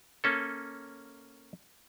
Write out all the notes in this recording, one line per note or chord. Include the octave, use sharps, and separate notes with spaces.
A#3 C#4 A4